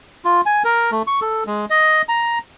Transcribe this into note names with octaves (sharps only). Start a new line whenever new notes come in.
F4
G#5
A#4
A3
C#6
A4
G#3
D#5
A#5